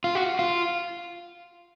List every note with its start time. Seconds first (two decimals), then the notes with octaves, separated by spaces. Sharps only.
0.04 F4
0.15 F#4
0.39 F4